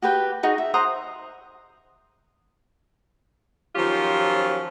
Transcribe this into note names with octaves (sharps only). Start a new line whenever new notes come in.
F#4 G4 B4 G5
D#4 F#4 G#4
E5
C5 F#5 A#5 D#6
D#3 F3 F#3 C#4 F4 G4